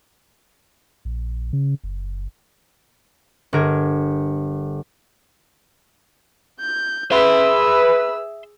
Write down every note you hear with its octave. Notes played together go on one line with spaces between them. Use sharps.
A#1
C#3
F#1
G1 A#4 G#6
G6
G#4 B4 E5 C6 E6